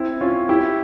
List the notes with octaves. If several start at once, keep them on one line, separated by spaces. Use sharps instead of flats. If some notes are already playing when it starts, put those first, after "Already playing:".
Already playing: C4 E4
C#4 F4
E4 G4